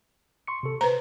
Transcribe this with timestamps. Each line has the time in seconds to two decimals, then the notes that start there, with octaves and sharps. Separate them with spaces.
0.47 C6 C#6 C#7
0.63 C3 A4
0.81 B4 C5 A#5